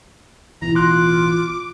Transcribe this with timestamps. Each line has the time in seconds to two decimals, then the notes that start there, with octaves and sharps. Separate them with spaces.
0.62 A1 B2 E3 E4 A#5
0.75 F4 C6 D6 F#6